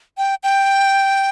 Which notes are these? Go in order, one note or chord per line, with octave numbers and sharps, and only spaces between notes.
G5
G5